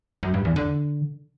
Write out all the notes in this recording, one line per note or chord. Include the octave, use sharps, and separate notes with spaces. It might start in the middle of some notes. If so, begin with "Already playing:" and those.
F#2
G2
E2
D3